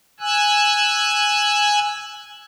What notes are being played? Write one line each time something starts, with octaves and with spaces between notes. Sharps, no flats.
G#5 E6 F#6